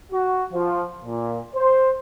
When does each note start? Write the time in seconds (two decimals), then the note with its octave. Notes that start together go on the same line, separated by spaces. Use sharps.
0.12 F#4
0.52 F3
1.04 A#2
1.53 C5